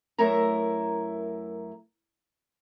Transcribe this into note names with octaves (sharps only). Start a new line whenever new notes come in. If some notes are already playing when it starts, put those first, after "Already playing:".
F#2 A3 E4 A#4 A#5